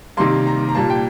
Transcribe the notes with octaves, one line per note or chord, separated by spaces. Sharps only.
C3 D#3 G3 A#3 C6
A#5
A#5
A#2 G3 A#3 A5
G5